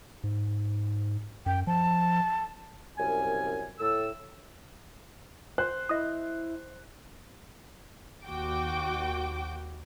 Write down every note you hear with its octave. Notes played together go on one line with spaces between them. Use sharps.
G#2
F#2 G5
F3 A5
C2 F#2 C#4 G#5
A2 A4 E6
C5 F#6
E4 D#5 D#6
D#2 F#4 G5 D6